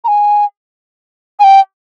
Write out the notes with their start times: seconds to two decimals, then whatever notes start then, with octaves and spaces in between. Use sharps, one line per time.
0.04 A#5
0.08 G#5
1.40 G#5
1.44 G5